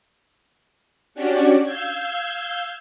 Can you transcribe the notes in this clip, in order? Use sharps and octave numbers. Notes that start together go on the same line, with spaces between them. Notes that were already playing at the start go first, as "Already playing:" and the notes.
C#4 D4 F#4 G4 C#5 D5
F5 E6 G6 G#6